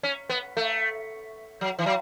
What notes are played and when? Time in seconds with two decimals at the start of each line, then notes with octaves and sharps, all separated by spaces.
0.03 C#4
0.30 B3
0.57 A3
1.61 F#3
1.79 E3
1.86 F#3